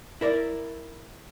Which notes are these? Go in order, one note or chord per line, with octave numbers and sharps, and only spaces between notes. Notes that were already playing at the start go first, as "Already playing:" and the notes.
E4 A#4 D5